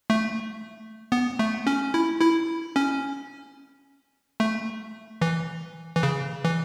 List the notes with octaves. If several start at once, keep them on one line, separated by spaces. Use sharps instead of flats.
A3
B3
A3
C#4
E4
E4
C#4
A3
E3
E3
C#3
E3